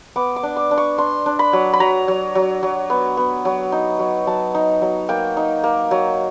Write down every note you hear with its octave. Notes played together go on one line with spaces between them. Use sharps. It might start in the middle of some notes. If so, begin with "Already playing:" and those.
B3 D6
D6
D4
D6
D4
C#6
D4 C6
D4
B5
F#3
B5
F#3 A#5
F#3
F#3
F#3
B3
B3
F#3
D#4
F#3
F#3 A5
D#4
F#3
A#3 G5
D#4
A#3
F#3